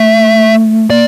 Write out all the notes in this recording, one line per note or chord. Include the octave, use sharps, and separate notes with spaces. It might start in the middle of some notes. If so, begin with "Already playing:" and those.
Already playing: A3 E5
A#3 D5